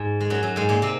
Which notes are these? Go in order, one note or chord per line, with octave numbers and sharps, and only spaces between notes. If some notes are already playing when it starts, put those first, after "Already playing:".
Already playing: G#2
G#3
F#2 F#3
F#2 F#3
G#2 G#3
A#2 A#3
C3 C4